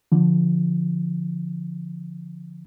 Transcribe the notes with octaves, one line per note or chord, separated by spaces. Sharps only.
D3 F3